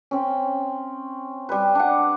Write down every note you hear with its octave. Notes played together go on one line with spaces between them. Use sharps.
C4 C#4
G3 B4
D4 F#5